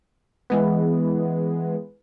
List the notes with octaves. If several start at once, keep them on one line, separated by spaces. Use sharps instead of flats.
E3 G#3 B3